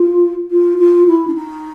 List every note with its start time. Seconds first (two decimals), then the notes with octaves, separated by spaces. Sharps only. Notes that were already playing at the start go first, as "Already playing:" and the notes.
Already playing: F4
0.51 F4
0.78 F4
1.07 E4
1.27 D4
1.35 D#4